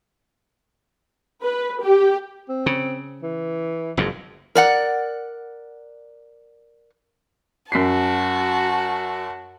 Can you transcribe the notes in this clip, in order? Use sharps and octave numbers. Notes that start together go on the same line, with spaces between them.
B4
G4
C4
C#3
E3
F#1 F2 G#2
A#4 D5 F#5
F#2 F#4 A5 B6 C7